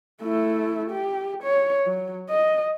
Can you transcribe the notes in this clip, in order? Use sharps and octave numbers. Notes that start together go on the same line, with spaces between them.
A3 E4
G4
C#5
F#3
D#5